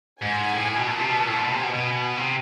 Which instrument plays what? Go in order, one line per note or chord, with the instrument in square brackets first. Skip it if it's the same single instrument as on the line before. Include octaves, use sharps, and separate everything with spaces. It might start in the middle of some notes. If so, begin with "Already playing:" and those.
[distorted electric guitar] G#2 [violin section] G#5
[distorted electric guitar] A2
B2
[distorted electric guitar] A#2 [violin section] A5
[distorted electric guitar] C3
B2
A#2
A2
A#2
B2
[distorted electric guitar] C3 [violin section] G#5
[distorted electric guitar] B2
B2
C3